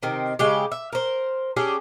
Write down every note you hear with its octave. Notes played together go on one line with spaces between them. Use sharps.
C3 D#3 C4
C#3 G#3 G4
E5
A#4 C5
C#4 D4 G4 G#4